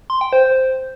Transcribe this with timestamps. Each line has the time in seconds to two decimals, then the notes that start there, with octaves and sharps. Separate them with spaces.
0.10 C6
0.21 G5
0.33 C5